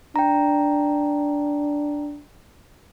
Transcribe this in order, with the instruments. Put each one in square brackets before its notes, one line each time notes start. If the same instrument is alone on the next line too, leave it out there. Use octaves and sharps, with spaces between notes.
[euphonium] D4 [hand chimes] G5 A#5